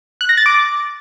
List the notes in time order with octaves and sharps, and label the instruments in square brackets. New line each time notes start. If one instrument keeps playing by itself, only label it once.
[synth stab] F#6
A#6
A6
D6